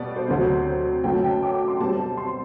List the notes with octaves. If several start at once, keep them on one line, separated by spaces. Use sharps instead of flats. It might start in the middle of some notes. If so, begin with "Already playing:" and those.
Already playing: B2 G3 B3 D5
C5
D2 C3 F#3 C4
F#2 D3 F#3 A3 G5
A5
G5
D6
D6
C6
B2 G3 C4 A5
C6